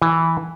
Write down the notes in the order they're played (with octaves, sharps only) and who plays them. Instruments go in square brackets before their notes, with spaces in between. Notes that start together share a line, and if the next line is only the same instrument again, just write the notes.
[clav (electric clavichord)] E3